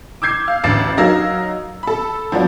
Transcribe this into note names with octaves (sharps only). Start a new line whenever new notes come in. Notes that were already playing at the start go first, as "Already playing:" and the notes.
D6 E6 G6 G#6 C7
F5
A1 D2 D6 A6 C7 E7
F#3 D#4 A#4 F5 E6 G#6
A4 B5
F3 F#3 B3 D4